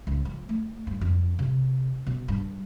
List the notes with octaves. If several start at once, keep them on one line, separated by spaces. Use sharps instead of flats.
C#2
F3
A3
G2
F2
C3
B2
G2